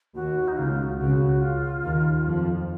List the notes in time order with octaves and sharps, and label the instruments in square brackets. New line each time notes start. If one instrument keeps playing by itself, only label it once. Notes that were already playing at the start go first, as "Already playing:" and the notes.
[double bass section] D#2 D#3 [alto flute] F#4
[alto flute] D#4
[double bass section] C#2 C#3 [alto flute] F4
[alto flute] F#4
[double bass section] C#2 C#3 [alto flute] F#4
[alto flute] F4
[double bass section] D#2 D#3
F2 F3